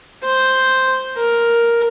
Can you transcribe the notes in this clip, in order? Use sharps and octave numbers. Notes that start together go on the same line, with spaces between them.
C5
A#4